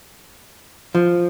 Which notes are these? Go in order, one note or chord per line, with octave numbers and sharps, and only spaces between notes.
F3